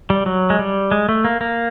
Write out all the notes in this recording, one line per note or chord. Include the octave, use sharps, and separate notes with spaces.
G3
F#3
G#3
G3
G#3
A3
A#3
A#3